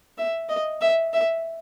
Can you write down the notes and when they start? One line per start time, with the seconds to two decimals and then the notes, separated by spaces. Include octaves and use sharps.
0.18 E5
0.49 D#5
0.81 E5
1.13 E5